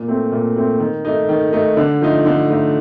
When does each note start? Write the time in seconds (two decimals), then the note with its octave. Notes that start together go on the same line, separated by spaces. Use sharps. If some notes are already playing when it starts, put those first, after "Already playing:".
Already playing: A#2
0.08 A3 C4
0.32 A#2
0.56 A3 C4
0.80 D#3
1.05 A3 D#4
1.29 D#3
1.53 A3 D#4
1.77 D3
2.01 F3 A3 D#4
2.26 D3
2.50 F3 A3 D#4